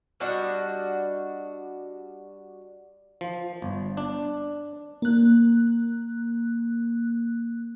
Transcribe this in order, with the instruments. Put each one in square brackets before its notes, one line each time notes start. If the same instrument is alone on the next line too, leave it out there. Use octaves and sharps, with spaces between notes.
[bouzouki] G3 D4 F#4 D#5
[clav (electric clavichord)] F3
G1
D4
[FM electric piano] A#3 F#6